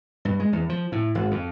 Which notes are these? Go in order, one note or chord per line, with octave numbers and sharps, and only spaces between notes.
G2
G#3
E2
F3
A2
G#1
F2